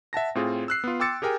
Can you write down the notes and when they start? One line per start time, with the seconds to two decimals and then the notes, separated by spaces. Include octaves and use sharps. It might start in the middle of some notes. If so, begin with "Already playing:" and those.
0.13 E5 F#5 A5 A#6
0.35 A2 C4 F4 G#4
0.68 E6 F#6 C7
0.84 B3 F4
1.00 G5 C6 D6 E6 A6 C#7
1.22 G4 G#4 A#4 G5 G#5